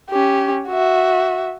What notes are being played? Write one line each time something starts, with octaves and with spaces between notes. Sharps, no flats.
C#4 G4
F#4 E5